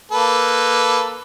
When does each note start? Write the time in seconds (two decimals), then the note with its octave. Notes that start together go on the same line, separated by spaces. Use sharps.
0.12 A#3 A4 B4